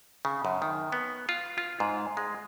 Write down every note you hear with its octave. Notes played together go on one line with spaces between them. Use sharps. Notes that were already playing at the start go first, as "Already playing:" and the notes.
C#3
F#2
D#3
B3
F4
F4
G#2
G#3